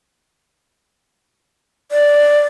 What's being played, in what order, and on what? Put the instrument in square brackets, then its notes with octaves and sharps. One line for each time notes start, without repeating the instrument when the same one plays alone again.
[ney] D5